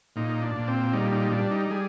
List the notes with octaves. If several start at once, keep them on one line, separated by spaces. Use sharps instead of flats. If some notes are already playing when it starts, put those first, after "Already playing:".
A#2 D#4
D4
A#2
C4
G3 D#4
D#4
G3 D4
D#4
G3 G#4